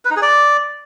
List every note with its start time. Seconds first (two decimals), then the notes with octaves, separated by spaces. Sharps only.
0.05 B4
0.11 D#4
0.16 G#4
0.22 D5